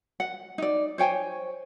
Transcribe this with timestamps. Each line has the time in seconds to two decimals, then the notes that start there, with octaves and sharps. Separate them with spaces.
0.20 F#5
0.58 D#4 D5
0.98 C5 C#5 G5 G#5